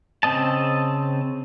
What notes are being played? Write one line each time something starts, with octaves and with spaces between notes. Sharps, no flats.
C#3 C4 D#5 A5